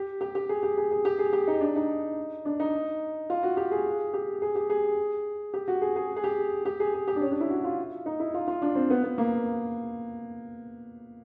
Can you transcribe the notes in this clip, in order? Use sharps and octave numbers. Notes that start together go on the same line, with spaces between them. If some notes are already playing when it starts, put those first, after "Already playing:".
Already playing: G4
G4
G4
G#4
G4
G#4
G#4
G4
G#4
G4
D#4
D4
D#4
D4
D#4
F4
F#4
G4
G#4
G4
G#4
G4
G#4
G4
F#4
G#4
G#4
G#4
G4
G4
G#4
G#4
G4
D4
C#4
D4
E4
F#4
F4
D#4
E4
F4
F4
D4
C4
B3
B3
A#3